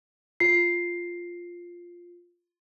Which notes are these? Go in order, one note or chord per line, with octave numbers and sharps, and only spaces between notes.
F4 C7